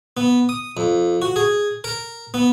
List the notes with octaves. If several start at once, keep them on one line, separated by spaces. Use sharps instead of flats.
B3
D#6
F2
F#4
G#4
A#4
B3